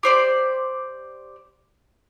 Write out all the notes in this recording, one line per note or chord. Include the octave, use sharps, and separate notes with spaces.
G4 C5 D5